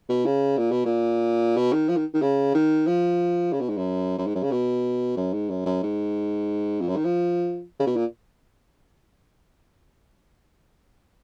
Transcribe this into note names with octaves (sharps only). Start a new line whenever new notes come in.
B2
C#3
A#2
B2
A#2
B2
D#3
F3
D#3
D#3
C#3
D#3
F3
C#3
B2
G#2
F#2
F#2
G#2
F#2
C#3
B2
F#2
G#2
F#2
F#2
G#2
F2
F#2
D#3
F3
C#3
B2
A#2